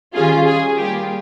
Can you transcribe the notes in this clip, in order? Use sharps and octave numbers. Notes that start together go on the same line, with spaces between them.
D#3 G3 C#4 F4 G#4
G#4
G3 A#3 F4 G4